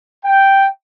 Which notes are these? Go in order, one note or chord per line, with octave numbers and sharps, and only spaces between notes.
G5